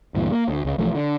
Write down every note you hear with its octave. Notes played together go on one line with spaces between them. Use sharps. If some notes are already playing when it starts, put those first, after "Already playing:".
D2 G2 A#2 E3
A#3
D2
C#2
B1 E3 F3 A3
D3